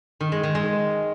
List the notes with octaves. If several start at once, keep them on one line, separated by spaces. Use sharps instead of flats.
D#3
G#3
D#3
G#3